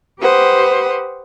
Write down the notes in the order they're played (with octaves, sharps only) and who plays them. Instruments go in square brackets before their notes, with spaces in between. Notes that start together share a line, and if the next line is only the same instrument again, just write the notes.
[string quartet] G4 B4 C5 F#5 D#6